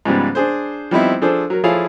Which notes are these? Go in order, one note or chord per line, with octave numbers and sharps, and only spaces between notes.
G#2 C#3 F3 G3 B3
D4 G#4 C5
F3 G3 B3 C4 D#4 E4
F3 D4 G#4 A4 C5
F#3 A#4
F3 E4 G#4 A4 C#5 F5